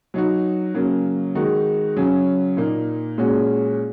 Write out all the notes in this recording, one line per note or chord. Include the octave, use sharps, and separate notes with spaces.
F#3 D#4 F#4
C#3 F#3 A#3
D#3 G#3 D#4 F#4
C#3 F#3 C#4
A#2 A#3 D#4
A#2 G#3 C#4 F#4